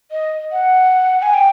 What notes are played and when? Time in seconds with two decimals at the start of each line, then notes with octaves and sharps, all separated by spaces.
0.11 D#5
0.52 F#5
1.22 G#5
1.34 G5